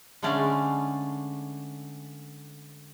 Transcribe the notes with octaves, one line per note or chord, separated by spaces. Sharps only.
D3 G#3 A3 C#4 D5 F5